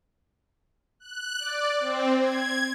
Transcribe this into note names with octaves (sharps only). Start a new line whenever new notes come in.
F#6
D5
C4
G#6